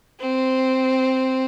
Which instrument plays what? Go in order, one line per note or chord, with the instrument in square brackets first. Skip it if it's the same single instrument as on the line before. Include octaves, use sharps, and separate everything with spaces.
[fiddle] C4